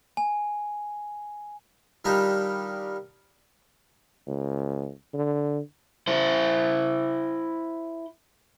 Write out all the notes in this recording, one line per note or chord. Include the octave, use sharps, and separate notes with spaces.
G#5
D#3 G3 D4 D#4 F4
C#2
D3
E4 C5